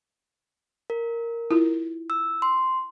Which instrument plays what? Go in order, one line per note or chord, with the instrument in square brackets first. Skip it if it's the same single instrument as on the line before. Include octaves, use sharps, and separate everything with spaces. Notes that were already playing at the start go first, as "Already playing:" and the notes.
[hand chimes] A#4
[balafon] E4 F4
[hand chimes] E6
C6